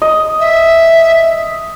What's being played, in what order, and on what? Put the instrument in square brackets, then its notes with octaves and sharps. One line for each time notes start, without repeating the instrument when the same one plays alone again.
[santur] D#5
[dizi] E5